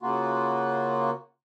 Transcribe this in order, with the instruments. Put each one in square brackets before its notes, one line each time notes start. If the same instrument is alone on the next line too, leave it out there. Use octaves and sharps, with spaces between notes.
[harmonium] C#3 A#3 F4 F#4